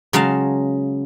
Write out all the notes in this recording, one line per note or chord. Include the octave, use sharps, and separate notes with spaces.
C#3 F#3 G#3 F5 A5